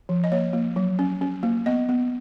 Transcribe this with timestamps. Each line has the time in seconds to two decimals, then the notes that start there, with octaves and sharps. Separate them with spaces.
0.09 F3
0.24 D#5
0.32 A#3 C#5
0.53 A#3
0.76 F#3
0.99 C#4
1.21 C#4
1.43 A#3
1.66 B3 D#5
1.89 B3